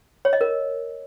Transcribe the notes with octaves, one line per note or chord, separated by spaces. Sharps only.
C#5
D#5
A#4